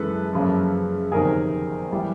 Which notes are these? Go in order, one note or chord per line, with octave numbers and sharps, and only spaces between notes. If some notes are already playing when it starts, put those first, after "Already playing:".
Already playing: F#2 C#3 E3 G#3 A4 B4
F#2 C#3 F3 A#3
G1 F2 C3 D#3 G#4 A#4
E3 G3